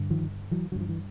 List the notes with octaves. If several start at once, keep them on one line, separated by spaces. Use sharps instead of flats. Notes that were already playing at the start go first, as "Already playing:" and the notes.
Already playing: G2 D3
D#3 F3
E3 F#3
G2 D3 F3 F#3
E3